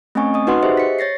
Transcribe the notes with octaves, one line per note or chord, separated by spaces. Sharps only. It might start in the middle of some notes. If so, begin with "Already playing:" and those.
A3 C4 C#4 D#5 G#5 C#6
D#5 D#6
D#4 F#4 B4 F#5 C6
G4 G#4 C5 D#5 E5
B6 C#7
C#5 A6 A#6 C7